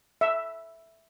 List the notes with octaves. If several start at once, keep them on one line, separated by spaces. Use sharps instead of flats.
E5